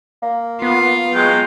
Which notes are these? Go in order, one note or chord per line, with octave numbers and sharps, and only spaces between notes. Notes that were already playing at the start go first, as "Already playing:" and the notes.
A#3
B3 F4
F#3 G#3 G5